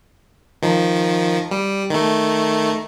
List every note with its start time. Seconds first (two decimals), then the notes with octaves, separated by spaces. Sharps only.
0.62 D#3 F3
1.51 G3
1.90 D#3 A3